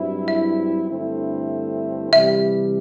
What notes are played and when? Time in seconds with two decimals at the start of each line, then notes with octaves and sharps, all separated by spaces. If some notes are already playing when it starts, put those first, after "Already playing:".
Already playing: G2 F#3 C4 E4
0.28 E5
0.90 G2 D3 A3 C4 E4
2.12 C3 E3 G3 E5